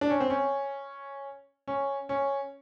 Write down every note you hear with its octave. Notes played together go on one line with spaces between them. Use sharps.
D4
C#4
C4
C#4
C#4
C#4